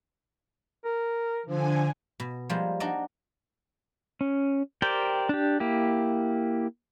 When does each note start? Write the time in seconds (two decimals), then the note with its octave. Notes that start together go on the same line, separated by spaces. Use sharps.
0.85 A#4
1.46 D3 F3 G#5
2.20 B2
2.49 F3 G3 G#3 A#3 F4
2.80 D4 D#4 F#4 D5 D#5
4.21 C#4
4.82 G4 A#4 C5 D5 G5
5.29 D4 G4
5.60 A#3 E4 G4